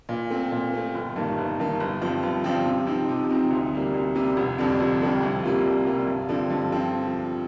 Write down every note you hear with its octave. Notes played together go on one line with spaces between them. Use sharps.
A#2
A3 C4
A#2
A3 C4
G1
G2 D#3 A#3
G1
G2 D#3 A#3
G1
G2 F3 C4
G1
G2 F3 C4
C3
F3 C4 D#4
C3
F3 C4 D#4
D2
C3 G3 A#3
D2
C3 G3 A#3
F1
F2 D3 G3 C4
F1
F2 D3 G3 C4
C2
C3 G3 A#3 F4
C2
C3 G3 A#3 F4
G2
D3 F3 C4
G2
D3 F3 C4